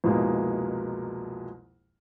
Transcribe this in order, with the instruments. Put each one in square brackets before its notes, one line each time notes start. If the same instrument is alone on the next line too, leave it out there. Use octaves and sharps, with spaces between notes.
[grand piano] C2 F2 B2 G#3 A#3